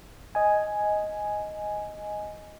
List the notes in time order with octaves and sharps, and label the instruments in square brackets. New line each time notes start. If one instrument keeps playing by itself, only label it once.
[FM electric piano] D#5 G#5